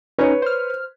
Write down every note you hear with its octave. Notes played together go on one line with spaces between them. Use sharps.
C#4 D#4 B4 C#5
C5 F6